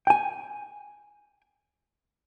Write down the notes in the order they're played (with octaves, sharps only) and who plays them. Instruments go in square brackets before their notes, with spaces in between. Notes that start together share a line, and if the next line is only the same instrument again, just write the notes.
[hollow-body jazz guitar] G5 G#5